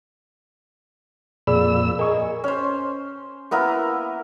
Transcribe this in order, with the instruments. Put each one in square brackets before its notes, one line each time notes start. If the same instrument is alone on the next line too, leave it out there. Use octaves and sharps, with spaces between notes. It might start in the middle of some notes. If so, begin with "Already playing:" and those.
[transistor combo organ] F2 A#2 E6 [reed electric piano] G#4 D5 B5
[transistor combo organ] G#4 [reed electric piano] A#4 D#5 C#6
[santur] C#4 C5
A#3 B3 E4 A#4